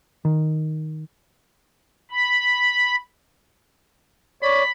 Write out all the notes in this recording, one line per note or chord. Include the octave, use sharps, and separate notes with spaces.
D#3
B5
C#5 D5 B5